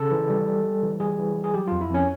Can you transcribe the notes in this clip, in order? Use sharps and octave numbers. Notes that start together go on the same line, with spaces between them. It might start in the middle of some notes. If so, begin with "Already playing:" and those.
Already playing: C#3 A4
E3
G3
G3
G3
E3
G3 G#4
E3
G3
G#4
F#3 G4
F2 F4
E4
F2 C#4